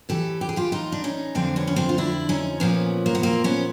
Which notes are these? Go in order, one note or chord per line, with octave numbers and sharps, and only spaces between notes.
A2 E3 G4 A4
G4
G#4
F4 G4
D#4 F4
D4
C#4 D#4
F2 D3 F3 C4 D4
B3 C#4
C#4
C4 D4
F4
D4 E4
C#4 D#4
A#2 F3 B3 C#4
A#3
B3
A#3 C4
B3 C#4